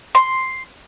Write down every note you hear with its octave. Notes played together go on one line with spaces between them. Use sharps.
C6